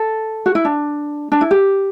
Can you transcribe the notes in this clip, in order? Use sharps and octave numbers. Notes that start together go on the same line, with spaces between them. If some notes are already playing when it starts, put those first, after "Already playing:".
Already playing: A4
F#4
E4
D4
D4
E4
G4